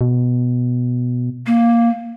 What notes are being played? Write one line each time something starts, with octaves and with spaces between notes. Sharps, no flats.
B2
A#3